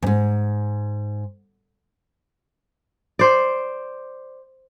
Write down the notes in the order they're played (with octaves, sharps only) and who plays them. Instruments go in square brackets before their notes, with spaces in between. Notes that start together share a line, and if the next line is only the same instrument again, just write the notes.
[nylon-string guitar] E2 G#2
[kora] C5 D5